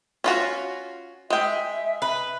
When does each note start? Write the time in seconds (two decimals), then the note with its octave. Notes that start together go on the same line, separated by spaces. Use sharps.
0.24 C#4 F4 F#4
1.30 G#3 E5 G5
2.02 B4